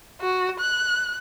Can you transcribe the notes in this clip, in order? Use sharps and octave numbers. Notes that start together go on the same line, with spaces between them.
F#4
F#6